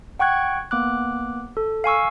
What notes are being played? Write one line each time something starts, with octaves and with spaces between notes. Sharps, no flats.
F#5 G5 C#6 F#6 G#6
A#3 B3 D6 F#6
A4
F5 G#5 C#6 E6